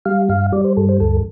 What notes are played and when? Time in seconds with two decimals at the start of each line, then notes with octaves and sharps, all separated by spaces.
0.06 G3 F5
0.29 G2 F5
0.52 G3 D5
0.64 C5
0.77 G2 A4
0.89 C5
1.00 D2 A4